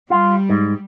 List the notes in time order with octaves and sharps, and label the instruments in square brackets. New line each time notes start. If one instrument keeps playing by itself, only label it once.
[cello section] G3 [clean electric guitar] F4
[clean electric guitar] G#2